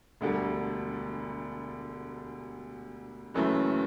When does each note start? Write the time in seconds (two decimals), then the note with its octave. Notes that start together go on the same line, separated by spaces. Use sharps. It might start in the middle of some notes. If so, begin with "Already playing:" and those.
0.21 E1 D2 D3 G3
3.34 F#1 F#2 E3 A3